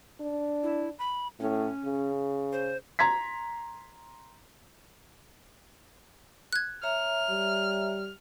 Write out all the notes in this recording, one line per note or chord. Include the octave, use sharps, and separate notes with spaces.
D4
E4
B5
A2 C#4
C#3
C5
A#5 C6 G#6 B6
F#6 G#6
C#5 E5 A#5 F6
G3